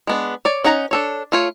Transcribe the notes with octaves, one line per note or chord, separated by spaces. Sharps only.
G#3 B3 D4
C#5 D5
C#4 D#4 F#5 A#5
D4 A4 C#5
A3 F4 C#5